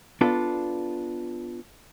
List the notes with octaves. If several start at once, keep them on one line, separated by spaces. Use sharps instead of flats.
B3 D4 F4 A4